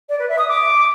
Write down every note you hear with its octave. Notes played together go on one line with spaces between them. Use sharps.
D5
B4
E5
D#6
D6